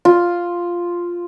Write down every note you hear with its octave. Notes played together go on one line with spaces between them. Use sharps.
F4